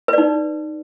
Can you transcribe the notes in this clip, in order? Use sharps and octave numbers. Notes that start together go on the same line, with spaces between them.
D#4 B4 D5